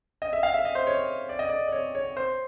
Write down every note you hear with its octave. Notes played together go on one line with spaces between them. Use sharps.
D#5
E5
F5
E5
D#5
C5
C#5
D5
D#5
D5
D5
C#5
C#5
C5